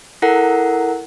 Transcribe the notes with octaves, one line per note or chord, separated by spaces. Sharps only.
E4 A4 A#4 F#5